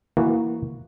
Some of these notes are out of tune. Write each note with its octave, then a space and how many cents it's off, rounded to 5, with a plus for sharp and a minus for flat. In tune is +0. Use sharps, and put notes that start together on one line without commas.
E3 +0 A#3 +0 F#4 +0